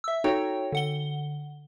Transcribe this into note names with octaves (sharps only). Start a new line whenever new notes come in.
E5 E6
D#4 F#4 A4 C#5 G5
D3 F#5 G7